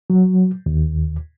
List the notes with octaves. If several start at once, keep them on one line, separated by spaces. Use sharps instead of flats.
F#3
D#2